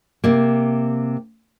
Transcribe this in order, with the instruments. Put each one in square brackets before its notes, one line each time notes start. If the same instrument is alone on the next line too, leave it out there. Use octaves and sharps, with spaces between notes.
[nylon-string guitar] C3 A#3